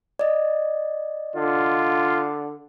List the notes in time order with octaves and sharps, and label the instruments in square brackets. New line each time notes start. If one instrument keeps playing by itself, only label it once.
[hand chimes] D5 D#5
[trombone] D3 [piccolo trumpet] F4